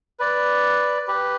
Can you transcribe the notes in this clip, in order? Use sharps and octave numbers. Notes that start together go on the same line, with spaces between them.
B4 D5
G4 B4